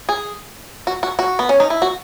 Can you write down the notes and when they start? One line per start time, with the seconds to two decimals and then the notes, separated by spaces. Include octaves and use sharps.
0.09 G#4
0.87 F#4
1.03 F#4
1.19 F#4
1.39 B3
1.49 C#4
1.60 D#4
1.70 E4
1.82 F#4